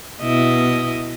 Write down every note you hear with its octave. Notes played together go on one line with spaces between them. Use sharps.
B2 E4 D#5